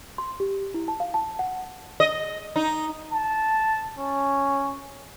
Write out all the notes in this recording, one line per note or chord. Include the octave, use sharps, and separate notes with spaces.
C6
G4
E4
A5
F5
A5
F#5
D#5
D#4
A5
C#4